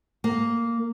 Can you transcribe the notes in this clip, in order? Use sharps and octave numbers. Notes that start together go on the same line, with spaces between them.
A#3